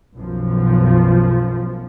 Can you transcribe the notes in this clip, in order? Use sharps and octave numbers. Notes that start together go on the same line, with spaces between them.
B1 F#2 F3